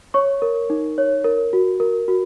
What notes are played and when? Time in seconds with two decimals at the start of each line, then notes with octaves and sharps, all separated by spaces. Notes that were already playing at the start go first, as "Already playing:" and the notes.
0.14 C#5 C#6
0.42 A#4
0.70 D#4
0.98 C#5
1.24 A#4
1.53 F#4
1.80 A#4
2.08 F#4